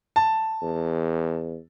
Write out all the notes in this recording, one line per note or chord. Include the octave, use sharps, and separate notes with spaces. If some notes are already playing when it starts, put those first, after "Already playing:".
A5
E2